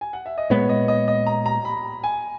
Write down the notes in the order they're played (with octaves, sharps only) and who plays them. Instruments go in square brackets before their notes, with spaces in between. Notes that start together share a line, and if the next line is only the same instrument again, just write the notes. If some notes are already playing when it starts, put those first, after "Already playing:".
[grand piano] G#5
F#5
E5
D#5
[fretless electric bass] A#2 G#3 B3 [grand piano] C#5
[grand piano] D#5
D#5
D#5
A#5
A#5
B5
G#5